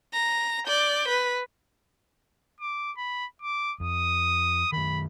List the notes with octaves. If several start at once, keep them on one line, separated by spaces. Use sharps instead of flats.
A#5
D5 G6
B4
D6
B5
D6
F2 D#6
F#2 D#3 B5